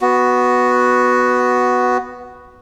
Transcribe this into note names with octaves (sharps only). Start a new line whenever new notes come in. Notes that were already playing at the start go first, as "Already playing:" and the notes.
B3 F#4